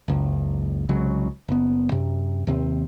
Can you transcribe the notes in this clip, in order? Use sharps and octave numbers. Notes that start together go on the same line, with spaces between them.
F#1 C#2
C2 C#3 F#3 G#3
F#1 B3
F#2 C3
D#2 C3 C4